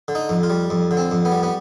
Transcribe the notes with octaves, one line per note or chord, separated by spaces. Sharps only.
D3
D#4
F2
F4
G3
F2
D3
C4
F2
B3
G3
B3